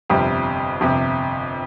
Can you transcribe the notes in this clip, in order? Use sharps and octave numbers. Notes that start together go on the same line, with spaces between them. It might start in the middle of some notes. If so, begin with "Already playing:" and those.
G1 F2 C3 G3
G1 F2 C3